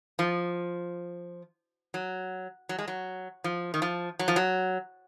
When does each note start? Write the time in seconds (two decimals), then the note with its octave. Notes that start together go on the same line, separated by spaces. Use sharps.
0.19 F3
1.94 F#3
2.69 F#3
2.79 G#3
2.88 F#3
3.44 F3
3.74 D#3
3.82 F3
4.19 F#3
4.28 F3
4.36 F#3